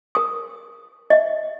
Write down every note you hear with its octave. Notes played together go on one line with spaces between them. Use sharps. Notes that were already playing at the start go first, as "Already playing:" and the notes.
A#4 D#6
D#5 E5